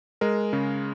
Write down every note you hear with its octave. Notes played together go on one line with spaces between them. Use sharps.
G#3 A#4
C#3